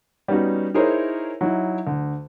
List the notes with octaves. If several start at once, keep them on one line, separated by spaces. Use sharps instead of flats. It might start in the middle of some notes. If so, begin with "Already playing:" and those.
G3 B3 C#4 D#4 F#4
D#4 E4 G#4 A#4 C5 C#5
F#3 D#4 E4
D2